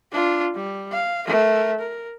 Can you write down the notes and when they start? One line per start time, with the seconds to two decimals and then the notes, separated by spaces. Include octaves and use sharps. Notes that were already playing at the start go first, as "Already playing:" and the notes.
0.12 D4 F4
0.55 G3
0.92 F5
1.27 A3 A#4
1.79 A#4